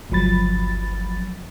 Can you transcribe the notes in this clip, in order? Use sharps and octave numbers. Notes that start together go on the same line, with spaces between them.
G1 C#2 F3 F#3 B5 A6